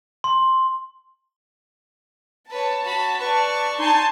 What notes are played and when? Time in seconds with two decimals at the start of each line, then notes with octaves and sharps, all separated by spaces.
0.24 C6
2.50 B4 C#5 A5
2.84 F#4 B5
3.21 B4 D5 C#6
3.79 D#4 G#5 A5 C6